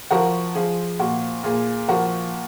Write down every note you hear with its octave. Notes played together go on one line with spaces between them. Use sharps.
F3 F#4 A#4
F3 G#4
A#2 F#4
A#2 G#4
F3 F#4 A#4